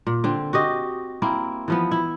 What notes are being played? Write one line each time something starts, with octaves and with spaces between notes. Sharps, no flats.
A#2
D3 C4
F#4 G4 D#5
A#3 C4 E4
E3 F3 B3
E4